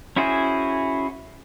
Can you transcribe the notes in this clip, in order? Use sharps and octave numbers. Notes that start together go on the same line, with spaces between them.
C#4 E4 F#4 G#4 C5